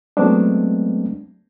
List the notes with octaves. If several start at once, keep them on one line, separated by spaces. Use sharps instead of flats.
F#3 G#3 A3 B3 C4 D4